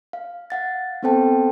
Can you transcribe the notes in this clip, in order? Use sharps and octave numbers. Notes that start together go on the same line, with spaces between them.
F5
F5 F#5 A6
B3 C4 A4 C5 G5 A5